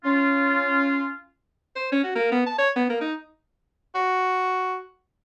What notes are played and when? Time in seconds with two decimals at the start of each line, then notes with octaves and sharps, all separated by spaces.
0.04 C#4 F4
1.76 C5
1.92 C#4
2.03 F#4
2.15 A#3
2.32 B3
2.46 A5
2.58 C#5
2.76 B3
2.90 A#3
3.01 D#4
3.95 F#4